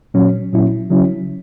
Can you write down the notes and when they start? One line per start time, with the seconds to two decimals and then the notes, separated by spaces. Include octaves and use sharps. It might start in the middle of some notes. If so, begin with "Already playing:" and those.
0.14 A#2 F#3 C#4
0.53 A#2 F#3 C#4 E4
0.90 C#3 F#3 C#4 E4